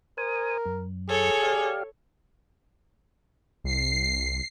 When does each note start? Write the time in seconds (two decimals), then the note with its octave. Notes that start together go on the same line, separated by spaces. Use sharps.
0.18 A#4 C5 G#5 D#6
0.66 F#2
1.09 G#4 A4 C#5
1.43 G4 D5 F5
3.64 C2 C7